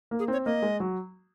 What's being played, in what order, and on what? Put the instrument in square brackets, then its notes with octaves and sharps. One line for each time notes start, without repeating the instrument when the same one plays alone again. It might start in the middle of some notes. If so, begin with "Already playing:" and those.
[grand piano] A#3
[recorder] G#4
[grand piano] C4 [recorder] C#5
[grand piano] A#3 [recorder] D#5
[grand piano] G#3
F#3